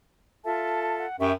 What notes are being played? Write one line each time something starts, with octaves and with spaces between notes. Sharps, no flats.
F4 A4 E5 A5
F#5
F#2 G4 E5 G5 C#6